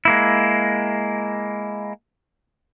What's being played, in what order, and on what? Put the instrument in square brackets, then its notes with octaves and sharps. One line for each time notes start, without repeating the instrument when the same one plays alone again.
[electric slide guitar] G#3 A#3 E4